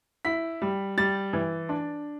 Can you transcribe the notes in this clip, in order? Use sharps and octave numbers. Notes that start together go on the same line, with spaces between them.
E4 B6
G3
G3 A6
E3
D4